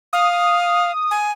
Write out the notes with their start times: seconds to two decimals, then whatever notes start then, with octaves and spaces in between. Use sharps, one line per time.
0.13 F5 D#6
1.11 G#5